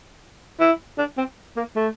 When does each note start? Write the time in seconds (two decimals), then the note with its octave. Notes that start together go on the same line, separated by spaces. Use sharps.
0.60 E4
0.98 D4
1.17 C4
1.56 A#3
1.76 A3